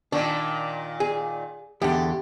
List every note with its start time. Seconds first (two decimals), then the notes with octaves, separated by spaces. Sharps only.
0.12 A#2 D#3 D4
1.00 G#4
1.82 E2 D3 G4